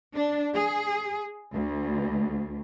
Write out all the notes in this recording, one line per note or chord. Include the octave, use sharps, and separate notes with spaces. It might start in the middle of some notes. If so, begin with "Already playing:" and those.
D4
G#4
D2